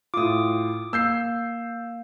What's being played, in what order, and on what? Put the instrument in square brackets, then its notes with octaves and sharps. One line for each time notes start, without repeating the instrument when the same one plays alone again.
[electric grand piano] A2 F4 [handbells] D6 D#6
[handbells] A#3 [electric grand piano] E6 G6 C7